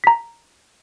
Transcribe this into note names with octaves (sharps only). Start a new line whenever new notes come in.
A#5 B6